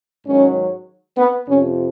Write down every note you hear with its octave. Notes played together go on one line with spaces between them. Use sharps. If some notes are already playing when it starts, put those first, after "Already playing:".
G#2 D#3 F#3 C#4
B3
F2 C3 F3 C#4